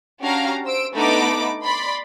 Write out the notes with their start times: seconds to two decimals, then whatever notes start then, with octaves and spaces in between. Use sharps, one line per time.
0.21 C#4 D4 F#4 G4 F5 A#5
0.65 C5 E6 D7
0.95 A3 B3 D4 D#4 B5 D6
1.64 D5 B5 C6